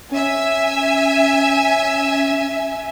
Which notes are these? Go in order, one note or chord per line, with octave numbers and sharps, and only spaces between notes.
C#4 E5 G#5